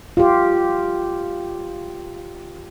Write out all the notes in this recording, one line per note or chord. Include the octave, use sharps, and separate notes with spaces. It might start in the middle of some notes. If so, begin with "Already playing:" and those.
F4 G4